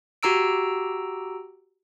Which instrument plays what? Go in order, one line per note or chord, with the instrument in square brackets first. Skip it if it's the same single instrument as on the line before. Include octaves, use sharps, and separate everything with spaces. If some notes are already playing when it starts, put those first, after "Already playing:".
[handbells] F#4 G4 A#5 E6 D7